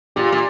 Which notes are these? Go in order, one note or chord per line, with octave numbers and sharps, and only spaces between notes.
A#2 G4
A#2